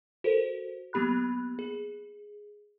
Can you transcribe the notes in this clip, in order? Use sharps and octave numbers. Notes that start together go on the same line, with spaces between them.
F#4 A4 A#4 C5
F#3 A#3 B3 G4 B5 F#6
G#4